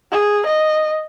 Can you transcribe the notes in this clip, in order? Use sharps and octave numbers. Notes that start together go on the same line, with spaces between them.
G#4
D#5